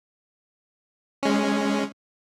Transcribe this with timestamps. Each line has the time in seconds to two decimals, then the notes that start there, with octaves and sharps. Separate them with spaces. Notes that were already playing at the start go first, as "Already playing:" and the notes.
1.23 G#3 C#4